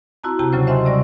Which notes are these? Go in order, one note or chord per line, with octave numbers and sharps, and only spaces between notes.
C4 E4 F#4 A5 A#5
C3 G4 G5 A5 A#5
D#2 C#3 F#3 C#4 C5 E6
C5 D#5 E5 F#5 G#5 C6
C3 G3 D5 C#6 A#6